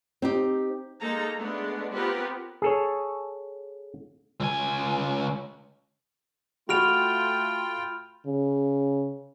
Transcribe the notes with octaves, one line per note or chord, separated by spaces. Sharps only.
C4 D#4 G4
G#3 A#3 D#4 A4 A#5
G#3 A3 B3 D4
B3 C4 F4 G4 A#4 B4
G#4 A4 C#5
C#2 G#5
A3 F4 F#4 G5 B5 F6 D7 F7
C#3